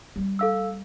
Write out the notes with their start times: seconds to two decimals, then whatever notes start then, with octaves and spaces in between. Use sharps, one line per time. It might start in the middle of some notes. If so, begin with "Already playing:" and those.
0.16 G3 A3
0.39 A4 F5 E6